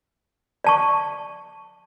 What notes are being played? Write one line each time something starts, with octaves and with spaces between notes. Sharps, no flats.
D5 A5 C#6